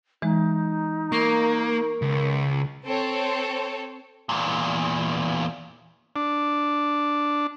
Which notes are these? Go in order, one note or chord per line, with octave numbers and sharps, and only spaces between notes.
E3 G#3 D#4
A#3 A#4 C#6
C#2
C4 A4 C5 C#5
E2 A#2
D4